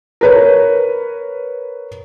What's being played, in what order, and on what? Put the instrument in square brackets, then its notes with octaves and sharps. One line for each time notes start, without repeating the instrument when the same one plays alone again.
[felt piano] A#4 B4 C#5